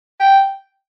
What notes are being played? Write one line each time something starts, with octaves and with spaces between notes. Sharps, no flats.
G5